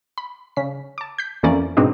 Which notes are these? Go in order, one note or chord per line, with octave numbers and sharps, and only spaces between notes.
B5
C#3 B6
A5 D6
G6 B6
F2 E3 A#3 C#4 D5
G#2 B2 C4 D4 D#4